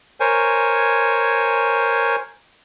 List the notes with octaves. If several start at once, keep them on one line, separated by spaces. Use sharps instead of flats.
A#4 C5 C#5 G#5